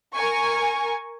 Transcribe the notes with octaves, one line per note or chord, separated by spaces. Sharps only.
A#4 G#5 C#6